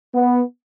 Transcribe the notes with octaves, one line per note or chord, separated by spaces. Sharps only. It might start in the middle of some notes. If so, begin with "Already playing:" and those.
B3